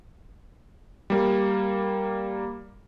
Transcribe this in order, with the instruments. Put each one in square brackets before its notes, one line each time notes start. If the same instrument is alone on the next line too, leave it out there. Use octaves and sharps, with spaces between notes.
[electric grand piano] G3 A#3